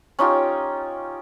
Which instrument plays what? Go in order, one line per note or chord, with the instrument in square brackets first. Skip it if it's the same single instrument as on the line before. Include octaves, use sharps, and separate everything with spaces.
[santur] C#4 D#4 F4 G4